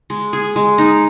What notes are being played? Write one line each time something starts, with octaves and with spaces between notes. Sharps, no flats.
G#3
G#4
G#3
D#4